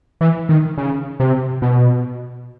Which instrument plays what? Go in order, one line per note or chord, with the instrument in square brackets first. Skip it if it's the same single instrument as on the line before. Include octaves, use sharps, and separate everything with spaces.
[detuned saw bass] E3
D#3
C#3
C3
B2